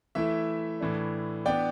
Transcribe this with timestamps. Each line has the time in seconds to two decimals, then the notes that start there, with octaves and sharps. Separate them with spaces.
0.15 E3 A3 E4 E5
0.80 A2 E3 A3 D4
1.46 E3 B3 D4 D5 G5